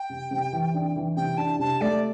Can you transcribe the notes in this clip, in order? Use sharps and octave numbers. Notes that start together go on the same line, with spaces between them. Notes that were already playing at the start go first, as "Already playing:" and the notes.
Already playing: G5
C3
C3
E3
D4
E3
C3 G5
D4 A5
C3 A5
A3 D5